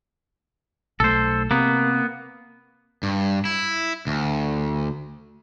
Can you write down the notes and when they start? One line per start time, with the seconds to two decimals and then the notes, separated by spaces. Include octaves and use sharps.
1.00 B1 F#3 A3 A4 C5
1.51 C3 A#3 B3
3.03 G2
3.45 E4
4.07 D2